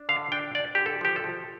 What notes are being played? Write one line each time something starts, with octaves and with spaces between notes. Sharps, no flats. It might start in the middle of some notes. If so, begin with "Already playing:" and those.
Already playing: D4
D3 F5
D4 G5
D4 D5
D3 G4
A4
F3 G4
A4
F3